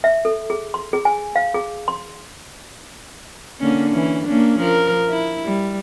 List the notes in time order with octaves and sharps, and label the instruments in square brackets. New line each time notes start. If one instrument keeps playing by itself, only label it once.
[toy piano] E5
A4
G#4
C6
G#4
G#5
F5
G#4
C6
[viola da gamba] D3 A#3 C#4
E3 C#4
A#3 C#4 D4
F3 A#4
E4
G3